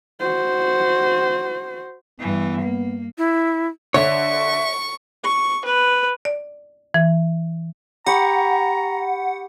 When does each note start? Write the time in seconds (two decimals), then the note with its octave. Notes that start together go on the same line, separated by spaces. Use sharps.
0.20 F#4 C5
2.20 G2 E3 B3
2.61 A#3
3.18 E4
3.94 D3 C#5 E5 C#6
5.24 C#6
5.65 B4
6.25 D5
6.94 E3
8.06 G4 F#5 A#5 B5 C#6